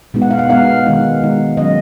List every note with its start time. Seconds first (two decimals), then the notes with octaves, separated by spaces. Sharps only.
0.14 B2 G#3 B3 D#4
0.22 F#5
0.31 F5
0.39 F#5
0.49 B2 G#3 B3 D#4 F5
0.86 D#3 G#3 D#4
1.22 D#3 G#3 D#4
1.57 D#3 F#3 C#4 D#5